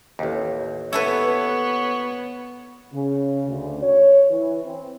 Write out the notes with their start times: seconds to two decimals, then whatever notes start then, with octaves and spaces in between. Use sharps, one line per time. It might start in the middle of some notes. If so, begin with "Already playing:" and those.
0.19 A1 D#2
0.93 B3 E4 A4 B4 C#5
2.92 C#3
3.47 D2
3.82 C#5
4.29 E3
4.64 C4